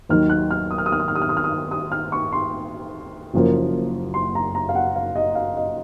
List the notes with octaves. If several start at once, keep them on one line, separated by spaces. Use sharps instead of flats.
D#2 D#3 F#3 F6
F#6
F6
D#6
F6
D#6
F6
D#6
F6
D#6
F6
D#6
F6
D#6
D#6
F6
C#6
C6
F#1 F#2 F3 A#3
C6
A#5
A#5
F5
F#5
F5
D#5
F5
D#5